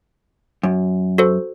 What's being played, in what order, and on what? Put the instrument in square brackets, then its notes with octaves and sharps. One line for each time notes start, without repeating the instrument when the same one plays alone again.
[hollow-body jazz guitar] F#2
[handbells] F#4 A4 C5